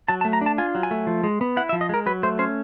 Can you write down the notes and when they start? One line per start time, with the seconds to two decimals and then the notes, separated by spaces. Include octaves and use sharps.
0.08 F#3 A5
0.21 A5
0.25 A3
0.33 A#5
0.41 D4 A5
0.58 F4 G#5
0.75 F#3
0.83 G#5
0.91 A3
1.07 F3
1.24 G#3
1.41 B3
1.57 E4 F#5
1.69 E5
1.73 F3
1.81 D#5
1.89 G#3 A#4
2.06 F#3 B4
2.23 A3 C5
2.39 C#4 C5